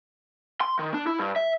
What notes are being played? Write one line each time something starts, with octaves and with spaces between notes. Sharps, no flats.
C6
D#3
D4
E4
G2
E5